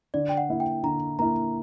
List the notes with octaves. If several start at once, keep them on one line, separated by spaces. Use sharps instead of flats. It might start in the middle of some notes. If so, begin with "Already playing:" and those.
D3 D5
G5
F#5
A#3 E4
G5
D3 A#5
A#3 E4 A#5